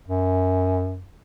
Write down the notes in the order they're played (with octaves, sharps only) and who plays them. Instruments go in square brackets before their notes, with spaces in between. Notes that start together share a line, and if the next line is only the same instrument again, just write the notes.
[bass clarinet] F#2